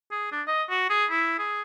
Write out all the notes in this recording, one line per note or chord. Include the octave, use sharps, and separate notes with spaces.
G#4
D4
D#5
F#4
G#4
E4
G#4